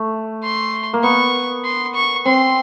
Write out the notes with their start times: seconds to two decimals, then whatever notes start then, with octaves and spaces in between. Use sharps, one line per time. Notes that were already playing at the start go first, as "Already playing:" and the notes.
Already playing: A3
0.43 C6
0.94 A#3
1.03 B3 C#6
1.65 C6
1.95 C#6
2.25 C4 C6